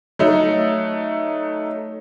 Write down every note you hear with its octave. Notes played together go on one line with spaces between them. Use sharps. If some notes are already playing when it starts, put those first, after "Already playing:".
F#3 A3 D#4